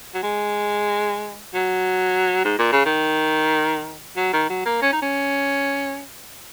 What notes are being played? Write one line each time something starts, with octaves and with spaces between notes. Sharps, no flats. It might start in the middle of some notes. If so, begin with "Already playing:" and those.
F#3
G#3
F#3
G#2
A#2
C#3
D#3
F#3
D#3
F#3
A#3
C#4
D#4
C#4